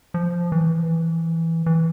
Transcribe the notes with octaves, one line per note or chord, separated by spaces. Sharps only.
F3
E3
E3